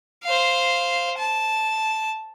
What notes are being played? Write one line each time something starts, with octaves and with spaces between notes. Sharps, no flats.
C5 F5
A5